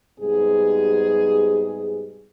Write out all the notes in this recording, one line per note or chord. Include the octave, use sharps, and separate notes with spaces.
G#2 C3 G3 B3 G#4